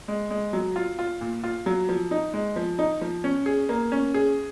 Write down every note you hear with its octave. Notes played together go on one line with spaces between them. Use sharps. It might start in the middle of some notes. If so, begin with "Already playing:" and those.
G#3
G#3
F#3
F4
F4
A#2
F4
F#3
F3
D#4
G#3
F3
D#4
F3
C#4
G#4
A#3
C#4
G#4